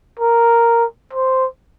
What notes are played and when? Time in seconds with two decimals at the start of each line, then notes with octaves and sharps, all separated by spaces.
0.19 A#4
1.13 C5